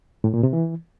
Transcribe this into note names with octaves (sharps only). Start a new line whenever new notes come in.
A2
A#2
C3
E3